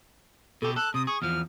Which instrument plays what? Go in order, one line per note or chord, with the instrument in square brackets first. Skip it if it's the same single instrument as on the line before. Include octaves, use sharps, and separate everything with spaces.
[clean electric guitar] B2 G4 [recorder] A4
[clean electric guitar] A4 [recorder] F#6
[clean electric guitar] C3 [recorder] D#6
[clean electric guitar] G#4 [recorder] C#6
[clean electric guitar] E2 F3 [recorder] F6